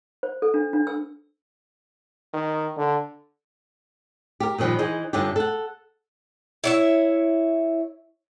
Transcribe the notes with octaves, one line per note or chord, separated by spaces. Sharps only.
C5
A4
D4
D4
E6
D#3
D3
G4 A#4
A#2 D#3 F3 G3 B4
E3 D#4 G#4 C5
G2 D3 C#4 D4 F4 G4
A4 F#5
E4 C#5 E5